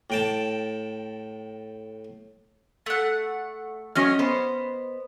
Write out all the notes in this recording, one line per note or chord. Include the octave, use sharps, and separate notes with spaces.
A2 G5 A5
A3 F#5
F#3 C#4 C#5 D#5 F6
B3 C5